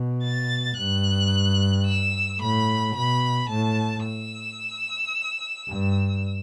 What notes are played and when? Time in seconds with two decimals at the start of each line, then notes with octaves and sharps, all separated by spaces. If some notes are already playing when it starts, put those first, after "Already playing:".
Already playing: B2
0.23 A6
0.77 G2 F#6
1.86 E6
2.40 A2 B5
2.96 B2 B5
3.50 A2 A5
4.05 E6
5.68 G2